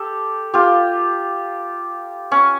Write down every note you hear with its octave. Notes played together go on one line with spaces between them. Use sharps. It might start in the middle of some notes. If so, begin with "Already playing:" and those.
Already playing: G4 A4
F4 G4
C#4